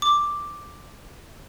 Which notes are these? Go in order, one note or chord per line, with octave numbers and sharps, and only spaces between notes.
D6